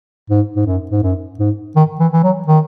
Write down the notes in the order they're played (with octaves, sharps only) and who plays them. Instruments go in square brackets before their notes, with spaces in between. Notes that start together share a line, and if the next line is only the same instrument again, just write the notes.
[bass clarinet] G#2
G#2
F#2
G#2
F#2
G#2
D#3
E3
E3
F#3
D#3